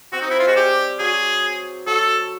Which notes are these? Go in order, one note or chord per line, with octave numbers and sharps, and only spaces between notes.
C4 F#4
D#4
E4
F4
G#3 F#4
G3 G4
F#3 G#4
F#3 A4